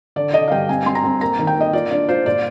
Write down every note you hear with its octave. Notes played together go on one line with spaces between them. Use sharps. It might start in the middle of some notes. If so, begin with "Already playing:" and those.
D3 D5
D3 D#5
F5
G2 G5
C4 G#5
C4 C6
A#5
C4
A#3 A#5
D#3
G5
A#3 D#5
F4 D5
D4 D5
F4 C5
A#2 D5